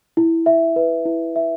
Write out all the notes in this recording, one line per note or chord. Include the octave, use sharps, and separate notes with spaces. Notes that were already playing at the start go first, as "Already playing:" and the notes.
E4
E5
B4
E4
E5